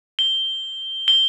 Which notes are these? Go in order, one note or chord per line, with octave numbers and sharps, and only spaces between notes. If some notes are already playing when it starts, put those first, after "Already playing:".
G7
G7